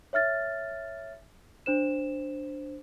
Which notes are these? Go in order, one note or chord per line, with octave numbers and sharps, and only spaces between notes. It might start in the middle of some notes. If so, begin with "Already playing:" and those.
C#5 E5 F6 A6
D4 C5 E7